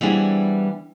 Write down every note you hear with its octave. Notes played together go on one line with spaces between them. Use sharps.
E3 G3 B3 C4 D4 G#4